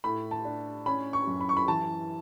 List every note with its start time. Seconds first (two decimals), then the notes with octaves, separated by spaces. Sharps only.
0.04 A2 B5
0.31 A5
0.45 D4
0.86 C#4 B5
1.13 C#6
1.27 F#2
1.41 B5
1.49 C#6
1.57 B5
1.68 E3 A5